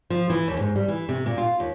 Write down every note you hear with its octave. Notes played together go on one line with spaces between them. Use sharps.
F3
E3
D#2
G#2
G3
E3
C3
A#2
F4
D#2